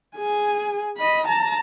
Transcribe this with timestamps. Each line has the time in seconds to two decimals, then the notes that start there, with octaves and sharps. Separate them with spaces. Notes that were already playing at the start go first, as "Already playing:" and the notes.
0.17 G#4 G#5
0.97 D#5 B5
1.27 A5 A#5